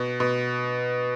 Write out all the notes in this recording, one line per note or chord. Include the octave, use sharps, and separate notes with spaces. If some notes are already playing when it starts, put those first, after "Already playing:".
Already playing: B2
B2